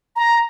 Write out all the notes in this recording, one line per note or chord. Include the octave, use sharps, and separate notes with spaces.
A#5